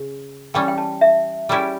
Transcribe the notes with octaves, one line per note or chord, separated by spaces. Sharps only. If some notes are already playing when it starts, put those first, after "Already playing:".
Already playing: C#3
E3 G3 C#4 G5
G5
A5
E5
G3 C#4 E4 G4